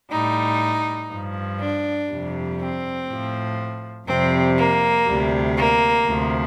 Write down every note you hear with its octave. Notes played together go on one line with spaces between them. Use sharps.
A2 G3 D#4
G2 F3
D4
F2 C3 G3
C4
A2 F3
F2 C3 G3 C4
A#3
D2 C3 G3
A#3
D2 C3 F3